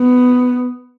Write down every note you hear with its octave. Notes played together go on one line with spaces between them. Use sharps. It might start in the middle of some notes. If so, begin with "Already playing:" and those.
Already playing: B3